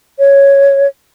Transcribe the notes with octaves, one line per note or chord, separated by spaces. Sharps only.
C#5